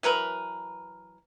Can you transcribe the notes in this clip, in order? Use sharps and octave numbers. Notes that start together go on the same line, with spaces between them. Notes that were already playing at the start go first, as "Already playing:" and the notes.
E3 F#3 A#4 B4